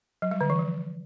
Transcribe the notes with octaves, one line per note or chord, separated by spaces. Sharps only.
F#3
G3
D3
E3
F3